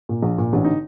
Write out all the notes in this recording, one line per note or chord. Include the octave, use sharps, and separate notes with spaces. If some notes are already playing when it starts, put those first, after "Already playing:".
A#2
A#1
A#2
A1 D4
D3 D#4